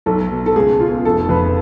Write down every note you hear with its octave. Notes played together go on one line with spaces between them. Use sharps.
B1 A4
B2
A4
C#2 G#4
B2 F4
F1 A4
F2 B4